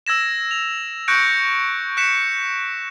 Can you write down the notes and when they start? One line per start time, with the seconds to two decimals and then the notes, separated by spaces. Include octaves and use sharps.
0.07 E6 G#6 A#6 E7
0.51 F7
1.08 C#6 F#6 G6 A#6 C#7 D7
1.97 F#6 B6 C#7 E7